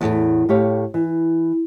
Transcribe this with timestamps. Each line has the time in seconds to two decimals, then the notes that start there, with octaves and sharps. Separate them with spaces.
0.01 E2 A2 A3
0.49 A2 G4 C#5 F5
0.94 E3